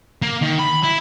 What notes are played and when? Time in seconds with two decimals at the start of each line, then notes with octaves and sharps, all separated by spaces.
0.22 A#3
0.42 D#3
0.60 B5
0.84 E4